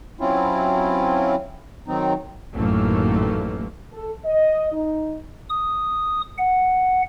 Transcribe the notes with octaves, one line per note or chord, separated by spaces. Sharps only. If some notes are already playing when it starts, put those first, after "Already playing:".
F#3 C4 C#4 E4 F4
D#3 F#3 C4 D#4
A1 F#2 D#3 A3 A#3
A4
D#5
D#4
D#6
F#5